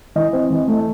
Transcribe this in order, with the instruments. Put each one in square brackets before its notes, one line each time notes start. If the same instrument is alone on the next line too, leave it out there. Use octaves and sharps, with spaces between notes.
[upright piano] E3 [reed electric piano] D#5
[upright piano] C4
E3
A3